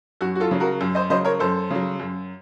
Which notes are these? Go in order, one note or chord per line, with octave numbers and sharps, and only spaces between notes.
F#2 F#4
F#4
F4 A4
C#3 F#3
F#4 A#4
F#2
C5 D#5
C#3 F#3 C5 D#5
A#4 C#5
F#2 A4 C5
C#3 F#3
F#2